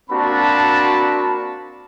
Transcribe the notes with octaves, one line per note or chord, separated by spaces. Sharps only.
A#3 C4 D4 F#4 A5 B5